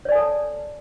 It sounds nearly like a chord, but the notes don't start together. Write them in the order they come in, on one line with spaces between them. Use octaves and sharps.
C#5 D5 G#5 A4 A5